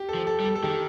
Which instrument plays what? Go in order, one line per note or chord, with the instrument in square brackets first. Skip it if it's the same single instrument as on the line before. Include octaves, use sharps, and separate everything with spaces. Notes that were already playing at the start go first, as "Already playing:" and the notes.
Already playing: [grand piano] G4
A4
[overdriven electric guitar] F3
[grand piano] A4
[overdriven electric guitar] G3
[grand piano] A4
A4
[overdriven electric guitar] D#3 [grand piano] G4